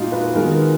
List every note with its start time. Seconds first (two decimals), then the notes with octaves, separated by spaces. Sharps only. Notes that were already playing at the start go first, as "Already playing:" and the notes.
Already playing: A#2 G#3 D#4 F4 F#4
0.12 B4
0.34 D#3 G#3 B3 A#4